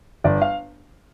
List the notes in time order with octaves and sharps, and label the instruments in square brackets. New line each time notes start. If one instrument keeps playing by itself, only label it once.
[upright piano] G1 D5
F5